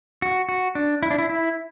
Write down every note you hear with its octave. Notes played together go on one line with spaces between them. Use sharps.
F#4
F#4
D4
E4
D4
E4
E4